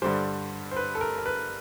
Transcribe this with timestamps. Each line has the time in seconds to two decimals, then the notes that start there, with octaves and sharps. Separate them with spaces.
0.02 G2 D3 G3 C5
0.71 C5
0.76 B4
0.95 A4
1.01 A#4
1.18 A#4
1.26 B4